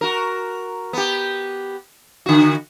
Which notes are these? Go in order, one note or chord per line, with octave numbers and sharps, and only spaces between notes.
F#4 A#4
B3 G4
D3 F#4